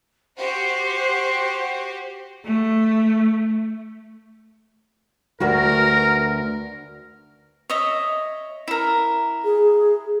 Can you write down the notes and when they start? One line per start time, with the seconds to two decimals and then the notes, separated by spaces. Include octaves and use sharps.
0.38 F#4 G4 C5 F#5
2.45 A3
5.40 D2 F#4 A#4 B4
7.70 C#5 D#5 E5
8.68 E4 A#4
9.45 G#4